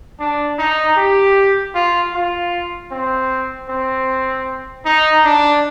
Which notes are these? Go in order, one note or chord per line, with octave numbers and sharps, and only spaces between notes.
D4
D#4
G4
F4
F4
C4
C4
D#4
D4